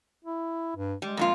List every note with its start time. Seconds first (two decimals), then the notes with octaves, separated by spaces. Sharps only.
0.25 E4
0.76 G2
1.02 G3 G#3
1.17 F2 A#2 F4